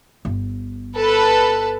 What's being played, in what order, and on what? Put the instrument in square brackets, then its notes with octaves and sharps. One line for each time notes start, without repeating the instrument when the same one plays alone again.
[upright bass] G1
[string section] A4 B4 A5